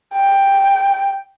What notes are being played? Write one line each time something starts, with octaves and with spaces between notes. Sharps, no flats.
G5